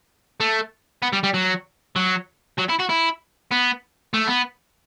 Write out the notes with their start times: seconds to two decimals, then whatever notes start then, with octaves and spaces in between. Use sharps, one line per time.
0.40 A3
1.02 B3
1.13 G3
1.23 G3
1.34 F#3
1.96 F#3
2.58 F#3
2.69 E4
2.79 F#4
2.89 E4
3.51 B3
4.14 A3
4.27 B3